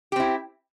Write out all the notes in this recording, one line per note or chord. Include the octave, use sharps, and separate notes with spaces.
C4 E4 G4